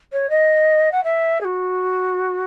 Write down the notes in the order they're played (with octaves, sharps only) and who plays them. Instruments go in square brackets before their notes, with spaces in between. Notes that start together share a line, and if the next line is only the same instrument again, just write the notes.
[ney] C#5
D#5
F#5
E5
G#4
F#4